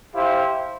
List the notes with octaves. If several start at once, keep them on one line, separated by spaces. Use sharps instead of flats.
E4 G4 C5 F5